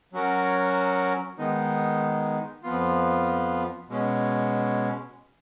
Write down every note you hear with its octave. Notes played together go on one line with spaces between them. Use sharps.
F#3 C#4 F#4 A#4
D#3 G#3 B3 D#4
F2 F3 B3 F4
B2 G#3 C#4